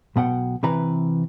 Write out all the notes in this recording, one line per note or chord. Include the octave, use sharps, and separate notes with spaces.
B1 B2 F#5 G5
C3 E3 B4 A#5